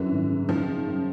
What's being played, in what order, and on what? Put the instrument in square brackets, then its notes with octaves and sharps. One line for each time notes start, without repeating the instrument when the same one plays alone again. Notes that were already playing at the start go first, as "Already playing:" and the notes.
Already playing: [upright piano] F#2 F#3 [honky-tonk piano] D3 E3
[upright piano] G#1
C#3
[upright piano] F#2 [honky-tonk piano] D#3 F3
[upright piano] C#3
F#2